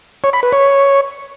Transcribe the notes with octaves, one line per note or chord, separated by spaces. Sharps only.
C#5
B5
B4
C#5